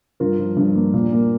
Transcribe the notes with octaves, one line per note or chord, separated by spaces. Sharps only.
G2 F4 A#4
F3
G2
A#3
A#2
A#3